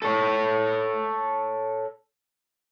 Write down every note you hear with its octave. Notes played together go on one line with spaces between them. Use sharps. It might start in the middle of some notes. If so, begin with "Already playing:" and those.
A4 C#5